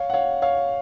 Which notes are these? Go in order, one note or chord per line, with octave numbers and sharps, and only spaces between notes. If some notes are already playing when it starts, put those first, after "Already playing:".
Already playing: C#5 F5
F#5
C#5 F5
C#5 F5